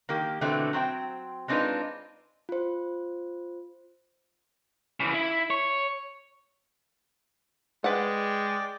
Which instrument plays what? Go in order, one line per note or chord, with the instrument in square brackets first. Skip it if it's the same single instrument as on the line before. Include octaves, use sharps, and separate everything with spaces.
[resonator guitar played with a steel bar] D#3 A#3 G4
B2 D3 E3 A3 C4
F#3 C4 C5 G5
G#3 C4 D4 D#4 F4 B4
[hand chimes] F4 C5
[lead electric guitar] C#3 E3
E4
C#5
[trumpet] G#3 [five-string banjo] B4 F#5 [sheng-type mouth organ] D5 G5